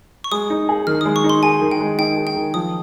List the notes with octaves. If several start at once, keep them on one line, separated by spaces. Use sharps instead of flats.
C#6
G#3 D#6
D#4
G#4
D#3 F6
D#6
G#3
C#6
D#4
C6
G#4 G#5
D#3
G5
G#3
D#4 G5
G#4
G5
D#3
F3 D#6